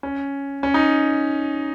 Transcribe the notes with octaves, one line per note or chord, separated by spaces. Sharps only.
C#4
C#4
D#4